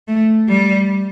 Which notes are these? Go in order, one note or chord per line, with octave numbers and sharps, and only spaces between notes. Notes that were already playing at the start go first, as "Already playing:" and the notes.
A3
G3